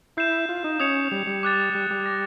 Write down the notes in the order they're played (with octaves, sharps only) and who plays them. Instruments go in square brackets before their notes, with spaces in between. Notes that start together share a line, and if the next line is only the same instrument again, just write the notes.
[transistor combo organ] E4 [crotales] G6 C7 E7
[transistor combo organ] F4
D#4
[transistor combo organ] C#4 [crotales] D#6 G#6 C#7 F7
[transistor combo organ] G3
G3
[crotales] D6 F#6 A6
[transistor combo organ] G3
G3
[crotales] D6 F#6 A#6